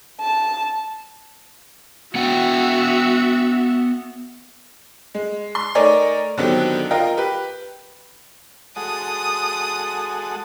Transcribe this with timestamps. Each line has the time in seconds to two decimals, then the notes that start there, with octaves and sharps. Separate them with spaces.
0.21 A5
2.15 B3 F#4 E5 F#5 G5
5.14 G#3
5.55 C6
5.75 A3 D#4 A#4 C#5 D5 G#5
6.38 D3 D#3 F#3 B3 C4 G4
6.91 F4 A#4 D#5 G5
7.17 G4 B4
8.76 G#3 F#4 A4 D#6